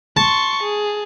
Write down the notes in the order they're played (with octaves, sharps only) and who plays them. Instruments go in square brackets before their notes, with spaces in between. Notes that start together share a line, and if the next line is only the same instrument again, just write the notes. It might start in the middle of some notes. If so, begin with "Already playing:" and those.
[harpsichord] A5 [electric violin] C6 C#6
[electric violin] G#4